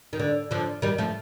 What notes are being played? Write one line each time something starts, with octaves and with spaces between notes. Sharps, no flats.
D#3
D3
D3 F3
D#3 G3
F3 A3